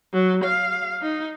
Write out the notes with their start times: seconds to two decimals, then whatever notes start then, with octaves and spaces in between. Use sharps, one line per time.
0.13 F#3
0.44 F5
1.02 D#4